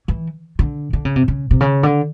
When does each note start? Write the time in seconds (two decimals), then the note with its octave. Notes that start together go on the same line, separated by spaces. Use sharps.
0.08 E3
0.59 D3
0.93 D3
1.05 C#3
1.16 C3
1.28 C#3
1.51 C3
1.61 C#3
1.83 D3